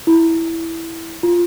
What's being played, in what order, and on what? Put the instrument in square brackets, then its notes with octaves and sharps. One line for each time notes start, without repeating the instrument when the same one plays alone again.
[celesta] E4
F4